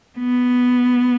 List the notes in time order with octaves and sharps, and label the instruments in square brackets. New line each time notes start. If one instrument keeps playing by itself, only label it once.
[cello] B3